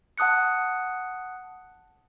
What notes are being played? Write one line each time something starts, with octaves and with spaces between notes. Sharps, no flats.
F#5 A5 D#6 F#6 C#7